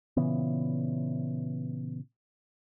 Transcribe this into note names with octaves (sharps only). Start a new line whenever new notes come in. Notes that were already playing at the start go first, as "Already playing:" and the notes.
A#2 C#3 E3 B3